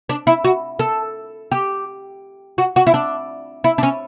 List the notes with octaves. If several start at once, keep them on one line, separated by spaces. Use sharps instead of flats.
D4
E4
F#4
A4
G4
F#4
F#4
E4
D4
E4
D4
C#4